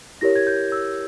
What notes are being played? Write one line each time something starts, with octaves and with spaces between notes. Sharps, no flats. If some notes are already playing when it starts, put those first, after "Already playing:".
E4 G4 A#4 C#5 A#6
G#6
G6
E6